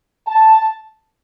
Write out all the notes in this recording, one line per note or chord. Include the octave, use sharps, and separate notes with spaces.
A5